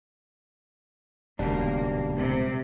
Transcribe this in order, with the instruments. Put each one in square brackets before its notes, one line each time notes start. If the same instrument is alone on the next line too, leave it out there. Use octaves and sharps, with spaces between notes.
[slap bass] D#1 C#2 [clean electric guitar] B2 G3 D4 [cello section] A#3
[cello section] C3